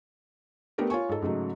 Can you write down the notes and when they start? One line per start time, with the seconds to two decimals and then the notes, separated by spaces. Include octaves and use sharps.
0.78 A3 B3 D4 G4 A4 A#4
0.90 F4 C#5 G#5 C#6
1.09 G#2 A4
1.22 G#2 C#3 F#3 A3